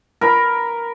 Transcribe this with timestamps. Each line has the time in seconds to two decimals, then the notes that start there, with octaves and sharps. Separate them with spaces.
0.21 A#4 B5